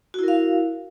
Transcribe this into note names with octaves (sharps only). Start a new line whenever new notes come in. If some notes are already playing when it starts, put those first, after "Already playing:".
E4 F#4 A#4 F5